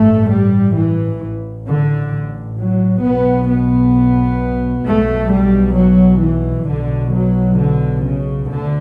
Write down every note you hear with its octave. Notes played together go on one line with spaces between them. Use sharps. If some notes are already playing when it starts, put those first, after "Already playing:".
Already playing: A1 G2 A3
G3
E3
A1 A2
D3
F#3
B1 B2 B3
B3
B1 B2 A3
G3
F#3
E3
B1 B2 D3
F#3
D3
C#3
D2 D3